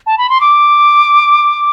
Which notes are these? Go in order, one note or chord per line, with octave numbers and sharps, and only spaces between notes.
A5
B5
C6
D6